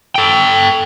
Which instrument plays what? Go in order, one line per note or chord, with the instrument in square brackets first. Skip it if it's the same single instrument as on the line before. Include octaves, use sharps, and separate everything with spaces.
[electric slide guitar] A4 G5